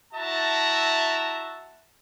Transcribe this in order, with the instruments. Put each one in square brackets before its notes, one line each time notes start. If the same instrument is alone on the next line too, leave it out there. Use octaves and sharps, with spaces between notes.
[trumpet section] E4 F#4 E5 A5 A#5